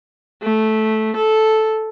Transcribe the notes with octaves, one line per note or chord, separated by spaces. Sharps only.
A3
A4